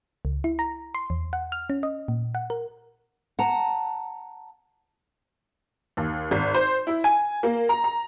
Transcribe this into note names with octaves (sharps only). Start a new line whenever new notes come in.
C#2
E4
A#5
C6
E2
F#5
F6
C#4
D#5
A#2
F#5
A#4
F#5 A5 A#5
D#2
G#1
C5
E4
G#5
A#3
A#5
A#5